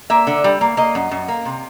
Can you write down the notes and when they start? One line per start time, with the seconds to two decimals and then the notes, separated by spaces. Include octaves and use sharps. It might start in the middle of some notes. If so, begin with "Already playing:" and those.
0.10 A#3 E5
0.27 D3
0.44 G3
0.61 A#3
0.77 A#3 D#5
0.95 F#2
1.11 F#2
1.28 A#3
1.45 C3